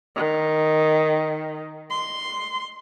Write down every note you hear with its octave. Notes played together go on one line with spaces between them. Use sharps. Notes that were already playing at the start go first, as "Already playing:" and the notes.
D#3
C6